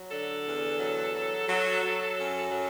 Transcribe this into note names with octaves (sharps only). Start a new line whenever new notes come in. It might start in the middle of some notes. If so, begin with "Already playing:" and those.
Already playing: F#3
D3 A4
E2
F#3
F#3
F#3
F#3
F#2
F#3